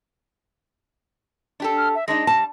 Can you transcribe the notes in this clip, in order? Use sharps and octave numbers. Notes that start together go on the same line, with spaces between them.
D4 G4 A4
F6
E5
G#3 D4 D#4 A#6
G3 A5